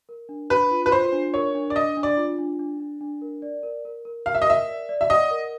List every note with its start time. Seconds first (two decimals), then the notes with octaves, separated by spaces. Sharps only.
0.09 A#4
0.29 D4
0.50 D4 B4
0.71 F4
0.86 B4
0.92 F4 C5
1.12 D4
1.34 A#4 C#5
1.55 D4
1.70 D5
1.76 D4 D#5
1.97 D4
2.03 D5
2.17 F4
2.38 D4
2.59 D4
2.80 D4
3.01 D4
3.22 A#4
3.42 D5
3.63 A#4
3.85 A#4
4.05 A#4
4.26 A#4 F5
4.35 E5
4.42 D#5
4.47 A#4 E5
4.67 D5
4.89 D5
5.01 E5
5.10 D#5 F#5
5.31 A#4